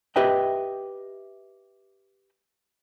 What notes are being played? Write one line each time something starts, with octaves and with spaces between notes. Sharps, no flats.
G4 B4 D#5 E5 G5